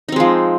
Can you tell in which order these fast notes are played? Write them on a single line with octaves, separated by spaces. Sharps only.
D#4 C4 G#3 F3